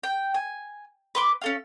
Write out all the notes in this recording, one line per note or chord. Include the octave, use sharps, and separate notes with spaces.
G5
G#5
B4 C6 D6
C#4 A4 F5